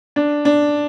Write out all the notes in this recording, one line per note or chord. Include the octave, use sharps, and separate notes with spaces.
D4
D4